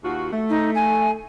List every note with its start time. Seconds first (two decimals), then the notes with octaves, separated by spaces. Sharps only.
0.04 D#2 F4 F#4
0.33 A3
0.50 D#4
0.75 G#5